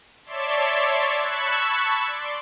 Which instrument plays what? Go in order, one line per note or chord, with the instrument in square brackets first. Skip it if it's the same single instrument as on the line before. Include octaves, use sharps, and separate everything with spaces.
[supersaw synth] C#5 D5 E5 A5 C6
A5 B5 C#6 E6 F#6 G#6
D5 C6